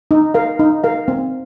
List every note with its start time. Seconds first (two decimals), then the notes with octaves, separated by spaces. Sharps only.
0.11 D#4
0.34 A#4 F5
0.59 D#4
0.84 A#4 F5
1.08 C4